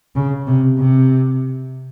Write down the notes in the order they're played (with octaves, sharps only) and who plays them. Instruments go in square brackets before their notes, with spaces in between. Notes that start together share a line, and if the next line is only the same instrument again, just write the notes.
[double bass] C#3
C3
C3